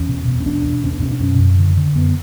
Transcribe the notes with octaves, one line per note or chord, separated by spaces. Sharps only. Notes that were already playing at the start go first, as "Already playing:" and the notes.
Already playing: E2 C#4
B2
B2
C#4
E2 D4
E2
B2 C#4
D4
B2 C#4
D4
F#2 C#4
F#2
D3
D3
F#2 B3